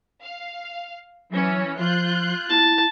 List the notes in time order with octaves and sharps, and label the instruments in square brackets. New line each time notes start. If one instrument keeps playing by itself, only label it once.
[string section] F5
[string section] E3 C#4 [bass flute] F#3
[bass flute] F3 [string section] F4 F#6 G6
[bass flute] E4 [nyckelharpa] A5